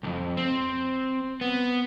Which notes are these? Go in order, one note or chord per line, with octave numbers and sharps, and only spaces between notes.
B1 F2
C4
B3